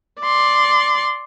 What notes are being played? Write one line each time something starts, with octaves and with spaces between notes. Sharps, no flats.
D5 C6